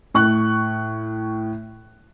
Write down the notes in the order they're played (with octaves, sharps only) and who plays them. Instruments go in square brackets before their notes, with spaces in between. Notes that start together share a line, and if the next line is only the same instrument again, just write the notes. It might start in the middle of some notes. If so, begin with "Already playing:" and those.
[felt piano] A2 C#6 F#6